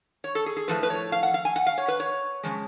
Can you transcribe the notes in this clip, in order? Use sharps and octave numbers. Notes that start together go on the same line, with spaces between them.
C#5
A4
G#4
G#4
A2 F3 A3 B4
B4
C#5
F5
F#5
F5
G#5
F#5
F5
C#5
B4
C#5
C#3 F3 G#3